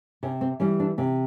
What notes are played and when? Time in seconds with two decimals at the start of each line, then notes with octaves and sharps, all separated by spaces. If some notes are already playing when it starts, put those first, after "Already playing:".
0.23 C3 C#4
0.41 C4
0.60 E3 G3 C#4
0.80 D4
0.98 C3 C#4